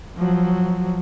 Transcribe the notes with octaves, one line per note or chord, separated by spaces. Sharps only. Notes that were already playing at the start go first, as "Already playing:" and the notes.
F3 F#3